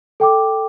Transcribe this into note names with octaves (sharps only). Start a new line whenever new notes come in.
A4 G5 D6